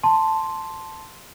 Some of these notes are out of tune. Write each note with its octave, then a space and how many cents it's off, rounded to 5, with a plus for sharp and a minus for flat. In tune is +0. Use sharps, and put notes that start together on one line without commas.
A5 +0 C6 +0